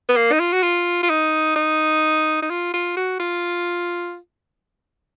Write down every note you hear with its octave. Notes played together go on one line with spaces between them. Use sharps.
B3
A#3
D#4
F4
F#4
F4
F4
D#4
D#4
D#4
F4
F4
F#4
F4